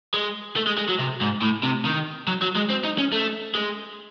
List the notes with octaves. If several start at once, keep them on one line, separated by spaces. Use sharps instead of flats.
G#3
A3
G#3
G#3
F#3
C3
G#2
A2
C3
D#3
F#3
F#3
G#3
C4
D#4
C#4
A3
G#3